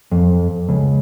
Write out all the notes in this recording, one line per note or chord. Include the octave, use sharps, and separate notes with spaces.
F2
C#2